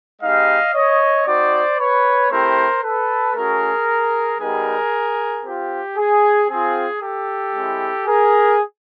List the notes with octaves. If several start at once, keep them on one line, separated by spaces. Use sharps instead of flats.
G#3 B3 D#4 G4 D#5 F5
C#5 D#5
C4 D#4 F#4 C5 D5
B4 C#5
A3 C4 E4 G4 A#4 C5
A4 B4
A3 C#4 F#4 G#4 A#4
G3 B3 D#4 G4 G#4 A#4
C4 F4 G4
G#4
C4 F4 G#4
G4 A4
G#3 C4 E4
G#4 A#4